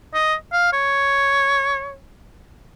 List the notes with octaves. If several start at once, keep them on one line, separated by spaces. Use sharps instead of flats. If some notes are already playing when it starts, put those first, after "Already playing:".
D#5
F5
C#5